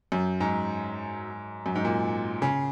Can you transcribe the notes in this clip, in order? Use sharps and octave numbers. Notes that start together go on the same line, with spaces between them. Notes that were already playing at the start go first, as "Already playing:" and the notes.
F#2
G#2
F#2
G#2
A#2
C#3